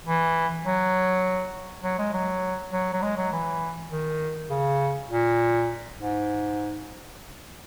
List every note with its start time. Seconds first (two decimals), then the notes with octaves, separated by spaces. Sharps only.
0.06 E3
0.65 F#3
1.83 F#3
1.99 G#3
2.13 F#3
2.72 F#3
2.93 F#3
3.02 G#3
3.17 F#3
3.32 E3
3.90 D#3
4.50 C#3
5.10 A#2
5.99 G#2